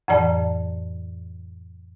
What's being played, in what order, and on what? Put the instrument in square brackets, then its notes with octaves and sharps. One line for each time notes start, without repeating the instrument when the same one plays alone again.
[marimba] F2 A2 E3 D5 A5